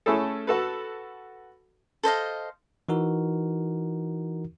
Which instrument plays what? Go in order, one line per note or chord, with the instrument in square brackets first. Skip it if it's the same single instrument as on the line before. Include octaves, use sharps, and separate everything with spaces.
[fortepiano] A3 C#4 E4 G#4 A4
F#4 A4 B4
[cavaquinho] A4 C5 D#5 F5
[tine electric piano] E3 D#4 F#4 A#4